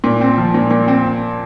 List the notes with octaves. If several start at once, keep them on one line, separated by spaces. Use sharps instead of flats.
A#2
C4
F3
A#2
A#2
C4